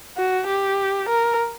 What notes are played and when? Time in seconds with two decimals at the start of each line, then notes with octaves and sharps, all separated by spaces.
0.17 F#4
0.47 G4
1.09 A#4